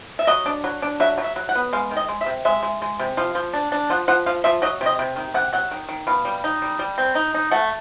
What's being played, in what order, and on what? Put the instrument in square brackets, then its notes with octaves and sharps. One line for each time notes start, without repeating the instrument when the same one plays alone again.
[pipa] E5
F#3 D#5
D4
F#3
D4
F#3 E5
F#3
E5
F#3
F#5
B3
G#3 F5
D#3
D#5
G#3
E5
C3
G#3 E5
G#3
G#3
C3
F3 F5
F3
D4
D4
F3 F#5
F3 F#5
F3 F5
F3 E5
F#3 D#5
C3
D#5
C3
D#3
C3 F#5
F#3 F#5
D#3
D#3
B2 F5
G3
D#4
G3
G3
C4
D#4
D#4
A3 F#5